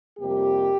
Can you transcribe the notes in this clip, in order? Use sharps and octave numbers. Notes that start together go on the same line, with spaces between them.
F2 C3 G3 A#3 G4